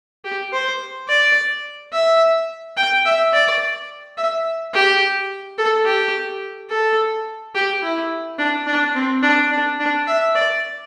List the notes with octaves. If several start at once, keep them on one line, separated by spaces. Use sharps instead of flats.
G4
C5
D5
E5
G5
E5
D5
E5
G4
A4
G4
A4
G4
E4
D4
D4
C4
D4
D4
D4
E5
D5